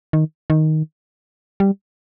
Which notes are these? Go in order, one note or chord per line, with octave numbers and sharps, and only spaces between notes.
D#3
D#3
G3